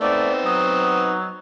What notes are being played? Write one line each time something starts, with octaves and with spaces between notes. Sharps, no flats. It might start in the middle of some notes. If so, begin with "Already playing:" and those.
A3 B3 C4 D#4 D5
F#3 D#6